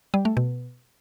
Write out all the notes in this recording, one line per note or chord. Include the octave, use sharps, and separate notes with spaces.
G3
A3
B2